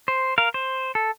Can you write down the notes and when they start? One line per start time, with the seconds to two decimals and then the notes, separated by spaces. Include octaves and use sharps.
0.08 C5
0.38 A#4 F5
0.54 C5
0.95 A4